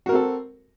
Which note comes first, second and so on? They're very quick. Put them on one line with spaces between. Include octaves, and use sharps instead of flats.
F#4 A#4 C4 A4